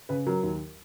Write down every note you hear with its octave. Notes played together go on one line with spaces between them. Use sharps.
C#3 B4
F#3 A#4
D#2